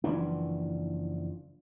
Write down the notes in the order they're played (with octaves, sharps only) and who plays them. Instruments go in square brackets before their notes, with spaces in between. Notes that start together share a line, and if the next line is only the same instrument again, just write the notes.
[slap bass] F#1 E3 F3 D4